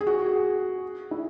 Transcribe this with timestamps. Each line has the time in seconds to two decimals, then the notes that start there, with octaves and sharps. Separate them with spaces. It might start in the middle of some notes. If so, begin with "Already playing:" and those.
0.01 G#4
0.07 F#4
0.26 G#4
1.11 E4